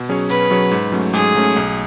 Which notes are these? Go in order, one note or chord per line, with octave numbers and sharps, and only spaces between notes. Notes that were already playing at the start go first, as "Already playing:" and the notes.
Already playing: B2
F#3 C#4 G#4 C#5
B2 B4
F#3 C#4 G#4 C#5
G#2
F#3 A3 C#4
G#2 G#4
F#3 A3 C#4
B1